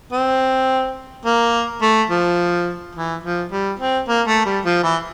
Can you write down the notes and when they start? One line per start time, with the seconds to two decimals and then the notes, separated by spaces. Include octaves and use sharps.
0.12 C4
1.25 A#3
1.82 A3
2.10 F3
2.95 E3
3.23 F3
3.52 G3
3.79 C4
4.08 A#3
4.27 A3
4.46 G3
4.65 F3
4.83 E3